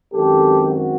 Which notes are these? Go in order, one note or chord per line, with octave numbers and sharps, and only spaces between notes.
F#2 D#3 G#3 C4 G4 A4
F#4